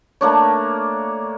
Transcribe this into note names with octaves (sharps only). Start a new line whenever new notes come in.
A3 A#3 D4 C#5